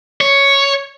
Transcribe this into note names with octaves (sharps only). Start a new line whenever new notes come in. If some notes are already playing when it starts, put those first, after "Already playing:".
C#5